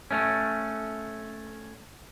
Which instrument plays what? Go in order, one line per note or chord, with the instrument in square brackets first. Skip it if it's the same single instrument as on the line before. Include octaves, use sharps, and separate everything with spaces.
[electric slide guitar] A3 C#4